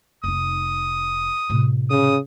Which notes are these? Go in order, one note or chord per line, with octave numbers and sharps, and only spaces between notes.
F1 D#4 D#6
A2 C3
C#3 D#6